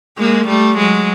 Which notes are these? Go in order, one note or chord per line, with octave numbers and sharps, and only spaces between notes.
G#3 A#3
G3 A3
F#3 G#3